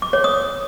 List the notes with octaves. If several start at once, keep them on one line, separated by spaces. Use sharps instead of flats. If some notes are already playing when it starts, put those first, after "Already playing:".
D6
C#5
D#6